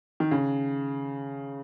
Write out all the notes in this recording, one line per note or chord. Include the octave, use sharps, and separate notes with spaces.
D#3
C#3